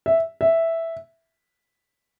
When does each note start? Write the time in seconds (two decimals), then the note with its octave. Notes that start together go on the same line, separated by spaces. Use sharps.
0.06 E5
0.41 E5